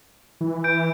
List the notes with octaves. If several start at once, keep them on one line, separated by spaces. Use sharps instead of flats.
E3
G6 D7